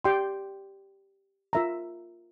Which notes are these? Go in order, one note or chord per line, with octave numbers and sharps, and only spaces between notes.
G4 D5 G5 C6
F4 A#4 E5 A#5